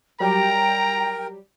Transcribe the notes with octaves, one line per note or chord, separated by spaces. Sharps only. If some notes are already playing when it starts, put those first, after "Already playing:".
F#3 G3 G4 A#4 G5 A#5